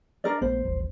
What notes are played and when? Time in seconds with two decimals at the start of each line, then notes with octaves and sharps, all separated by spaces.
0.24 D4 A#4 D5
0.42 A#1 A3 B3 C5
0.63 D#1 A1